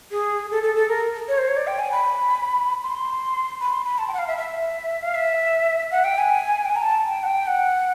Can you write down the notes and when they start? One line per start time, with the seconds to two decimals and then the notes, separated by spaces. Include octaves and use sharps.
0.11 G#4
0.51 A4
0.63 A4
0.76 A4
0.89 A#4
1.28 C#5
1.38 C5
1.48 C#5
1.57 D5
1.67 G5
1.79 G#5
1.92 B5
2.83 C6
3.60 B5
3.73 C6
3.85 B5
3.98 A5
4.08 G5
4.13 F#5
4.18 F5
4.28 E5
4.38 E5
5.02 F5
5.15 E5
5.91 F#5
6.04 G5
6.18 G#5
6.65 G5
6.69 G#5
6.76 A#5
6.83 A5
7.07 G5
7.23 F#5
7.27 G5
7.47 F#5